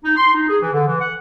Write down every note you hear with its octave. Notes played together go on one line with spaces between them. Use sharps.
D#4
C6
D#4
G#4
E3
D3
E3
F#5